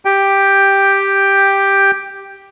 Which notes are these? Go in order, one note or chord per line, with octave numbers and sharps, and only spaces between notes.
G4 G5